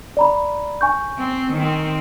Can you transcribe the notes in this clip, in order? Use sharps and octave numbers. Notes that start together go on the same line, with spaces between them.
D5 A#5 B5
G#5 C#6 G6
C4
D#3 C4